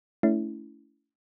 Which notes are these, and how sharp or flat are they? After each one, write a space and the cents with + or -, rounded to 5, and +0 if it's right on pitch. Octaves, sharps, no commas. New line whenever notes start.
A3 +0 C#4 +35 E4 +0